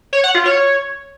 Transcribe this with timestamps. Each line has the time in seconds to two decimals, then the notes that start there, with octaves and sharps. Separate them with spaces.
0.13 C#5
0.24 F#5
0.35 F4
0.46 C#5